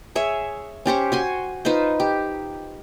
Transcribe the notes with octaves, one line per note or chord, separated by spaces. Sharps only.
G#4 C#5 E5
C#4 G4 C5 C#6
F#4 G#5 C6
D#4 F4 B4 C5
G4